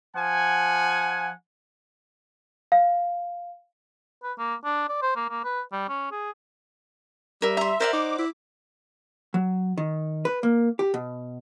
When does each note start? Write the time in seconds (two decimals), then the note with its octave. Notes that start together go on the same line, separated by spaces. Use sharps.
0.15 F3 F#5 G#5
2.72 F5
4.23 B4
4.38 A#3
4.65 D4
4.89 D5
5.02 C5
5.16 A#3
5.30 A#3
5.44 B4
5.72 G3
5.89 C#4
6.11 G#4
7.42 G3 A#4 E5
7.57 E5 A#5 C6
7.80 A#4 C5 D5 F#5
7.93 D#4 D6
8.19 E4
9.34 F#3
9.78 D#3
10.25 B4
10.43 A#3
10.79 G4
10.94 B2